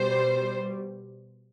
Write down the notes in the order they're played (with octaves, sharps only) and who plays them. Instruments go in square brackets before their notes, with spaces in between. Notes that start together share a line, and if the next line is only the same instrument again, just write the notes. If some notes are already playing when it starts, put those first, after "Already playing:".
Already playing: [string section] B2 G3 C5